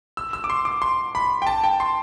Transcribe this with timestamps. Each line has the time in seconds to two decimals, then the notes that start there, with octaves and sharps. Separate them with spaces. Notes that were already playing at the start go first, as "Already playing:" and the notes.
0.17 E6
0.33 E6
0.44 D6
0.50 C6
0.65 D6
0.82 C6
1.15 B5
1.42 G5
1.47 A5
1.64 G5
1.80 C6